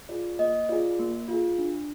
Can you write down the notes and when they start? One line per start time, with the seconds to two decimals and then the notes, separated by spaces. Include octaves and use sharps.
0.09 F4 G#4 D5
0.39 A#3 D#5
0.69 F4 G#4 D5
0.99 A#3
1.28 F4 G#4
1.58 D4